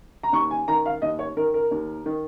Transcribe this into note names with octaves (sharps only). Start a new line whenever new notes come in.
A#5
D#2 C#6
G#5
D#3 A#5
F5
D#2 D#5
C#5
D#3 A#4
A#4
D#2
D#3